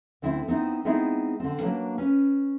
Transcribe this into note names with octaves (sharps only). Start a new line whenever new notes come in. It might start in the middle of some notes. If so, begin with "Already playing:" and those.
D2 D3 C4 E4
B3 C4 D#4 E4
G#3 B3 C4 D#4 E4 G#4
D3 C4
F#3 A#3 D4 B4
C#4 B4